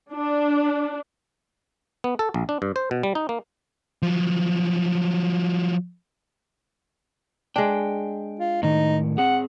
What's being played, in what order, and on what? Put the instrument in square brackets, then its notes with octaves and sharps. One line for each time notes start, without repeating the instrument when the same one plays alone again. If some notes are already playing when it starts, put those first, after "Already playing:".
[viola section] D4
[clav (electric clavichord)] B3
A4
A#1
D4
G2
C5
B2
G3
D#4
A#3
[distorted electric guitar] F3 F#3
[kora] G#3 D4 [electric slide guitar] G5
[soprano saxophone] F4
[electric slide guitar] A2 D#3 [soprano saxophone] D#4
[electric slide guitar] C4 G#4 [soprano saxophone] F#5